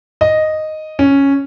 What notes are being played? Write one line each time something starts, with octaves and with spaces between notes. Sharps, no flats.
D#5
C#4